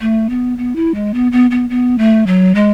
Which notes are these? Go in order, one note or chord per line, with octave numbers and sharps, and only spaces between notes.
A3
B3
B3
E4
G#3
B3
B3
B3
B3
A3
F#3
G#3